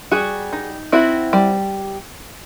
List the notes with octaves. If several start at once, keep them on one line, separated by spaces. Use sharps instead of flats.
G3 F#4 G#4
D#4
C4 E4 F#4
G3